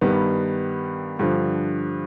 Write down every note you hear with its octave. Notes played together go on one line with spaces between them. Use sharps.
G2 D#3 G3 B3
G2 D3 F3